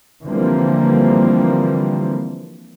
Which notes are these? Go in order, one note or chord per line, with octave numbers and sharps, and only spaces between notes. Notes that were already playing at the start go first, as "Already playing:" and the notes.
D3 E3 F3 G3 A#3 C4